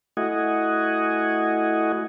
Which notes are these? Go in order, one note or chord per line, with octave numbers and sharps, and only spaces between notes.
A3 E4 F#4 D#5 F#5 G#5